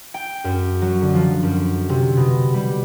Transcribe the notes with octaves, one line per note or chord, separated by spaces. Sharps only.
G5
F#2
F#3
D3
F3
F#2
C3
B2
G3